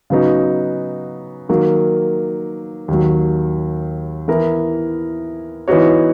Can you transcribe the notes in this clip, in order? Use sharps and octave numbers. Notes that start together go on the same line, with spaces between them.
C#3 F#3 B3 D#4 F#4
D#3 F#3 A#3
D#2 D#3 F#3
E3 B3 E4 A#4
E3 B3 D#4 F#4 C#5